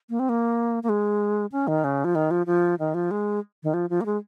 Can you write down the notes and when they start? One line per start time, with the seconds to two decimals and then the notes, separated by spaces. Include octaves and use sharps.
0.10 A#3
0.19 C4
0.29 A#3
0.83 A#3
0.89 G#3
1.52 C#4
1.68 D#3
1.84 C#3
2.05 F3
2.15 D#3
2.31 F3
2.47 F3
2.79 D#3
2.94 F3
3.11 G#3
3.63 D#3
3.74 F3
3.90 F3
4.01 A#3
4.06 G#3